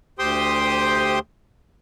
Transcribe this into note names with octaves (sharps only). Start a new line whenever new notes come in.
D2 G4 C5 G5 C6 D#6